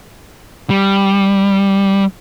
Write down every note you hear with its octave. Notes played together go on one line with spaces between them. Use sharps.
G3